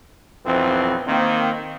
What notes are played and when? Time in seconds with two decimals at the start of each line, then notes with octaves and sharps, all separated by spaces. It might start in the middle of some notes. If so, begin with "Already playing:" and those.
0.45 B1 F2 E3 C4
1.07 D#3 A#3 C4